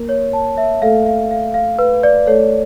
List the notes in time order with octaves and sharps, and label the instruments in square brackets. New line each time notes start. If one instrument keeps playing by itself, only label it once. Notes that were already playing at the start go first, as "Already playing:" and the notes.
Already playing: [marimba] A#3 A#4
[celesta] C#5
A5
E5
[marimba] A3 A4 [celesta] F5
[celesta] F5
F5
F5
B4
D5
[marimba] A3 A4 [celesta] C#5